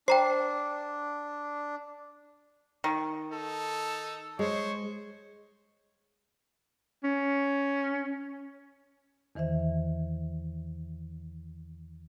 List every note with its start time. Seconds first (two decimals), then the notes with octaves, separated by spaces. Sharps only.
0.08 D4 C5 G5 A#5 C7
2.84 D#3
3.32 D#4 A4
4.39 G#3 C5 C#5
7.04 C#4
9.35 E2 D#3 E3 C5 E5